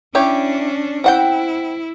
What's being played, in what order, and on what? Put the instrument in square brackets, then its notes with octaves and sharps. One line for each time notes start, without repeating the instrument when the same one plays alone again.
[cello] C#4 D4 [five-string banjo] E4 G4 C#5
[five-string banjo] C4 F#5 G5 [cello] E4